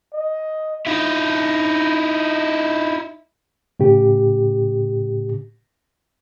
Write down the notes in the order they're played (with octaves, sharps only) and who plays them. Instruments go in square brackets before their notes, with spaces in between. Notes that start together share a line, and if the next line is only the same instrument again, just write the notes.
[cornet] D#5
[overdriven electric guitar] D#4 E4
[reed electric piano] A2 C#3 G4